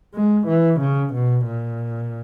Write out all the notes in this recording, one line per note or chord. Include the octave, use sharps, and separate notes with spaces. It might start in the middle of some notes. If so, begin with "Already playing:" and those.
G#3
E3
C#3
B2
A#2